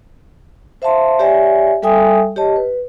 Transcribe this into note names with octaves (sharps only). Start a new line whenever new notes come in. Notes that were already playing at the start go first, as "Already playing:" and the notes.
C5 E5 F5 A5 C6
G4 C#5 D5 E5 G#5
G3 A4 E5 G5 G#5 D#6
G4 C#5 D#5 A5
B4